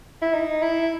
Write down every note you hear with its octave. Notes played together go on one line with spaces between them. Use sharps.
E4
D#4
E4